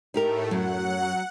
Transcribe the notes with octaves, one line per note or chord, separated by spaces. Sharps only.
A2 A3 D#4 G4 A#4
F#2 F#3 F#5